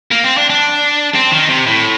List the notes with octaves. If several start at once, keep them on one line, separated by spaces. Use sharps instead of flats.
A#3
C4
D4
D4
C4
D#3
C3
A2